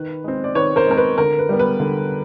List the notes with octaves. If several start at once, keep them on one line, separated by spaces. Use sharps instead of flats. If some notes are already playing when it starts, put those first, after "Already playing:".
Already playing: D#3 B4
G#3 C4
D5
D#3 B4 C#5
A#4 C5
G#3 C4 A#4
B4
D3 A#4
B4
G3 B3
B4
D3